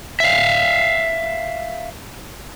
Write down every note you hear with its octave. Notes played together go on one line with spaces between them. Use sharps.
E5 F5